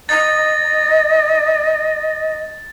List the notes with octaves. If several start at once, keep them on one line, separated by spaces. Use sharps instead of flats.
D#5 A6